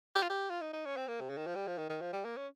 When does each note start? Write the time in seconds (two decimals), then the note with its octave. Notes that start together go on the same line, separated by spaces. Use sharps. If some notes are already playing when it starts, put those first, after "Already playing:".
0.15 G4
0.22 F4
0.30 G4
0.50 F4
0.61 D#4
0.73 D#4
0.85 C#4
0.97 C4
1.08 A#3
1.20 C3
1.29 C#3
1.38 D#3
1.46 F3
1.55 G3
1.67 F3
1.78 D#3
1.89 D#3
2.01 F3
2.13 G3
2.25 A#3
2.37 C#4